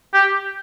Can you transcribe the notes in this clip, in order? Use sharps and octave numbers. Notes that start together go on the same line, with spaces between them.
G4